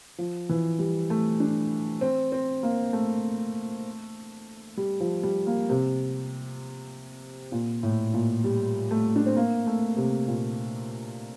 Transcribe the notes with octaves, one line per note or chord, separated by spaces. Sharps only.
F3
E3
G3
A3
D4
C4
C4
A#3
A3
G3
F3
G3
A#3
C3
A#2
A2
A#2
G3
A3
D4
C4
A#3
A3
C3
A#2